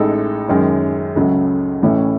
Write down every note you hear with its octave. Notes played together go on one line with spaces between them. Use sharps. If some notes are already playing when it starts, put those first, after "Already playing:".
Already playing: A1 A2 G#3 D#4 A4
F#2 D#3 G#3 C#4
C#2 C#3 F#3 A3
A1 A2 E3 A3 C#4